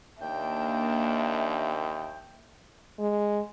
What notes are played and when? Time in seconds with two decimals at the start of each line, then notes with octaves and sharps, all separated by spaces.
0.22 D#2 A#3 D4 E5 G5
2.99 G#3